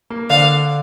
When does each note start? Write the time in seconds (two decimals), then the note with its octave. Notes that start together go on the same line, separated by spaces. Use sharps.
0.10 A#3
0.30 D3 D4 F5